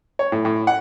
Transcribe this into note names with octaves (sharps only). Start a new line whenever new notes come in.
C#5
A2
A2
F#5